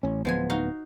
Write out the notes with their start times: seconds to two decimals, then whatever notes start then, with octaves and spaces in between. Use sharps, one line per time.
0.03 A1 C#4
0.25 D1 F3 G#3 B3 G#5
0.50 D#4 F#4 F5